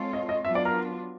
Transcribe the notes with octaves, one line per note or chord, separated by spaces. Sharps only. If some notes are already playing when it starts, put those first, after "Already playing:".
Already playing: G#3 C4 F4 A4 C#5
D#5
D#5
F#3 B3 D4 F4 E5
D5
A#4